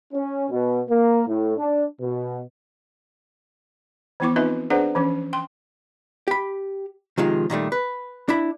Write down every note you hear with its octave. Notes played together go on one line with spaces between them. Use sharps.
C#4
B2
A#3
A2
D4
B2
E3 F3 B3 E4 C#6 D6
C4 D#4 F4 B4 D#5 E5
D4 G#4 B4 C5 D5 F#5
E3 F3 C#4
G5 C6
G4 B5
C3 D#3 F3 G#3 F4
A#2 D#3 G3 A3
B4
D4 E4 B5